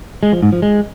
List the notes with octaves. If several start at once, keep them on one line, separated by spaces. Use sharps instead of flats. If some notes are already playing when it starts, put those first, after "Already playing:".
G#3
F3
G#2
F3
G#3